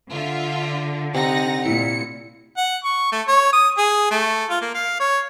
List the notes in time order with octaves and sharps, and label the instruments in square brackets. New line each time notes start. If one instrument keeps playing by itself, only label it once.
[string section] D3 [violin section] F4 E5
[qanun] C3 [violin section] D#4 F#5 A#6
[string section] A#2 [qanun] E4 [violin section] C#7
[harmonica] F#5
C#6
A3
C#5
D#6
G#4
A3
F4
A#3
F5
C#5